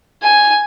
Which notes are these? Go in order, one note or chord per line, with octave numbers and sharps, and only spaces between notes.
G#5